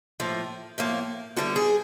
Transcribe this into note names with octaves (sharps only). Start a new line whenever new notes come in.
A2 F3 A#3
A2 F3 A#3
D3 G3 B3 F#4
G#4